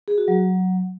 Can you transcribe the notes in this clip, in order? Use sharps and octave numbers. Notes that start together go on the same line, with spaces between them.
G#4
F#4
F#3